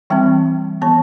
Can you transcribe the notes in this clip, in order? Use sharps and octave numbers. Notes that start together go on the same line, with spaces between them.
E3 G3 C4 G5
E3 B3 A5